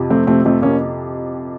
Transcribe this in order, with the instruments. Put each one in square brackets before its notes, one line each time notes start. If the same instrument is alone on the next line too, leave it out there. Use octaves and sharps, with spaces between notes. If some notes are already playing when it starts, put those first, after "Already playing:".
Already playing: [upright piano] F2 C3 F3
[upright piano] F2 [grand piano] A3 C4
[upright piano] C3 F3 [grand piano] A3 C4
[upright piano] F2 [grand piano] A3 C4
[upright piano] C3 F3 [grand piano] A#3 C#4